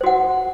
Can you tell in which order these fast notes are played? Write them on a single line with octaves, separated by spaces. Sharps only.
C5 F#4 F#5